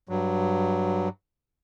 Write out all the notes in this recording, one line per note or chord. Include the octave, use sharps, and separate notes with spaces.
G2 F#3